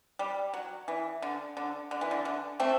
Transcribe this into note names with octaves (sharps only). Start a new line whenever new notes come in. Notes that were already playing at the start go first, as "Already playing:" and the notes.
G3
F#3
E3
D3
D3
D3
E3
D3
D3
A3 C4